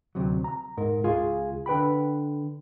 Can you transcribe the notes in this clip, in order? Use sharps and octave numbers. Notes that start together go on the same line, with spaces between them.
D2 C3 F#3
A#5
G#2 A#4
C#2 F4 G#4
D3 B4 G5 B5